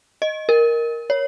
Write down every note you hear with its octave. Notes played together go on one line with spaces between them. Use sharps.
D#5
A#4
C#5